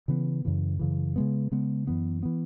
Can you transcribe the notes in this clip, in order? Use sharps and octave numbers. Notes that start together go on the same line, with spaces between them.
C#3 E3 B3
F#2 C#3 E3
F#2 C#3 E3
C#3 G#3 B3
C#3 G#3 B3
F#2 E3 B3
E3 B3